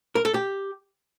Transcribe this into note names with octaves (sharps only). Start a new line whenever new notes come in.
A#4
A4
G4